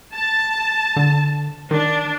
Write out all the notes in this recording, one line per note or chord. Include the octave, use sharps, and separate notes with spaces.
A5
D3
D#3 D4